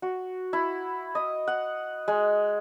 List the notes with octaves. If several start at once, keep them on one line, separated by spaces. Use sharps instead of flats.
F#4
E4
D#5
F#5
G#3